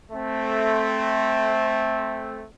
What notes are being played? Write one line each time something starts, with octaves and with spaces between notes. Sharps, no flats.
A3 C4